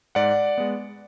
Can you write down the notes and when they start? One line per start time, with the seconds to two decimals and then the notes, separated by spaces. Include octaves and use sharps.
0.15 G#2 D5 F#5
0.58 G#3 B3